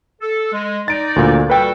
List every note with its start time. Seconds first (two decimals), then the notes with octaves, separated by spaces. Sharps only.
0.21 A4
0.52 G#3
0.88 D#4 D5 A6 D7
1.16 D2 A#2
1.50 G3 F#4 A4 B4 G5